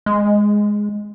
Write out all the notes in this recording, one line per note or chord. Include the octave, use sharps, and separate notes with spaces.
G#3